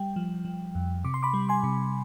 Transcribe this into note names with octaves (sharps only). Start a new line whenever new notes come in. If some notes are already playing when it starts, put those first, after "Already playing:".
Already playing: G3 G5
F3
F3
F2
C3 D6
C6
B5 D6
G3
G#5 C6
C3